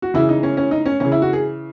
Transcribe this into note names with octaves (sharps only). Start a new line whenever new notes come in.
F#4
C#3 E3 E4
D#4
C#4
C#4
D#4
C#4
C#3 E3 C#4
E4
F#4
G#4